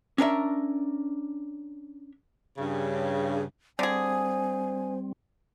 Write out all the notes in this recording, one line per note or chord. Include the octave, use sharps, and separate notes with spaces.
C#4 D4 A#4 E5
G2 C#3
D3 G3 C4 G#4 C5 G#5